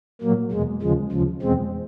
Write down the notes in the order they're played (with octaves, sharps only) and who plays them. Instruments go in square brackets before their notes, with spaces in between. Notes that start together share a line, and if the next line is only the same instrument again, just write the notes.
[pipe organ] A#2 F#3 A#3
E2 B2 G#3
D#2 C#3 F3 G#3
D2 C#3 F3
E2 B2 G#3 C4